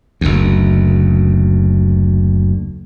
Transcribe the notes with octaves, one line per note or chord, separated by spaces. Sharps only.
F#1 D2